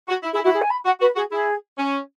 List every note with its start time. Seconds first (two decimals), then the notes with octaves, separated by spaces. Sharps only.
0.08 F#4
0.23 E4
0.33 E4 G#4
0.44 E4 F#4
0.54 G#4
0.62 G#5
0.70 B5
0.85 F#4 F#5
1.00 F#4 B4
1.16 F#4 G#4
1.31 E4 G#4
1.78 C#4